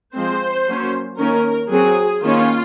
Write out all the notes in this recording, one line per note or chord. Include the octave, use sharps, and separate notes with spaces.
F3 G#3 C4 C5
F#3 A#3 C#4
D#3 A#3 C#4 A#4
F#3 C4 G#4
D#3 A#3 C#4 F4